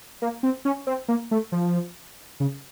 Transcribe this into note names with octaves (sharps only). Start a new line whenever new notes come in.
A#3
C4
C#4
C4
A#3
A3
F3
C#3